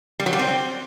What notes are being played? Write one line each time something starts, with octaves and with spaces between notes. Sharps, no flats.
G3
F#3
G3
C4